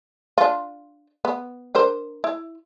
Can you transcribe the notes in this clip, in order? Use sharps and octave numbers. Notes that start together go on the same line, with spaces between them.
D4 F4
B3
D4 A#4 C5
E4